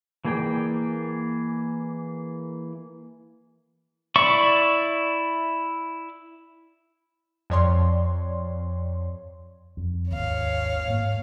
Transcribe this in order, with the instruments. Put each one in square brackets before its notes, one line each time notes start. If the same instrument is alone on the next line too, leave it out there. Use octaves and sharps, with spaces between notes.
[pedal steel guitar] E3 A#3 G#4 D5 G5
E4 D5 E5 C#6
[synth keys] F2 F3 C#5 D5 C6
[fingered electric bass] F2
[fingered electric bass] G#1 D#2 [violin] C#5 F5
[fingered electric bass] G#2 A#3